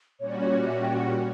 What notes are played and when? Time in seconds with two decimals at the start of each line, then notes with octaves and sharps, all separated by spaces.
0.19 A#2 G3 C#4 F#4 C#5
0.29 D5
0.38 C#5
0.66 E5
0.82 G5
0.97 F#5
1.14 G4